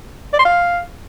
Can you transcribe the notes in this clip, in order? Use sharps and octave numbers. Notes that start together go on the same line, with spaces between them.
D5
C6
F5